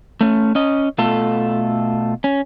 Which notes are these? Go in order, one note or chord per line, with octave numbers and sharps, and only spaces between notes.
A3 C#4
C#4 D#5
B2 A3 F4 A4
C#4